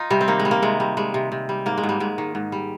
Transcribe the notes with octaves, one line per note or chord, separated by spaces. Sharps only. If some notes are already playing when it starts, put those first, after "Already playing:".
Already playing: D#4 F4
C3 G3
C4
D#3 A#3
G#3
G3
A#3
C3 G#3
G3
G3 G#3
C3
C3
G3
G#2 A#3
G#3
G#2
G3
G#2 G#3
D#3
G#2
G3